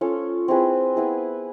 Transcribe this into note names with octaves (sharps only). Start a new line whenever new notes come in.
C#4 F4 A4 C#5
C4 E4 G#4 B4
B3 E4 G#4